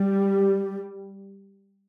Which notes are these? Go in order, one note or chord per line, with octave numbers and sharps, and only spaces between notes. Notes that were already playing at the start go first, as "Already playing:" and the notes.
Already playing: G3